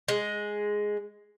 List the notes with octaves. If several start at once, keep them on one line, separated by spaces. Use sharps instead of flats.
G#3